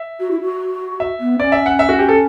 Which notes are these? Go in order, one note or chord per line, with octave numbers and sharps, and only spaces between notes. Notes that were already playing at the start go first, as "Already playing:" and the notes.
Already playing: E5
F#4
E4
F#4
E5
B3
C#4 D5
E5
F#5
E5
F#4
G4
A4